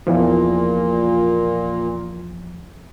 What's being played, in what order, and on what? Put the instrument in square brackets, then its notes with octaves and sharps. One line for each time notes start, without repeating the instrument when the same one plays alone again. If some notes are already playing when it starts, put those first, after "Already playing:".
[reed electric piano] E2 E3 F3 [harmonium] A#2